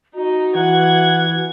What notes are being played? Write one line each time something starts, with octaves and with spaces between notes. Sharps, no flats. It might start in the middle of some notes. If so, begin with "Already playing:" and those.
D#4 F#4
E3 F#5 G#6